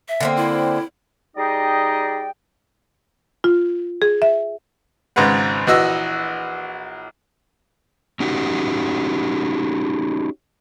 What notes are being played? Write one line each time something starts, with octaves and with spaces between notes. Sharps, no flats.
E5
D3 A#3 C4
E4
G3 D#4 G#4 D5 D#5 G5
F4
G#4
E5
G#1 G#2 C#3 B4 F#5
A#1 E3 F#4 D#5 E6
C#4 D#4 F#4 G4